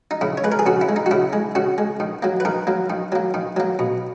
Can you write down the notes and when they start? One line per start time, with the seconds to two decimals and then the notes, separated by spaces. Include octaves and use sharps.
0.11 D#4
0.21 C#3 E4
0.37 C#5
0.44 G#3 B4
0.52 A#4
0.59 G#4
0.66 C#3 F#4
0.81 E4
0.89 G#3
0.96 D#4
1.06 F#4
1.11 C#3 E4
1.33 G#3
1.55 C#3 F#4
1.78 G#3
2.00 D#3
2.23 F#3 A#3
2.40 B4
2.45 D#3 A#4
2.67 F#3 A#3
2.90 D#3
3.12 F#3 A#3
3.34 D#3
3.56 F#3 A#3
3.79 B2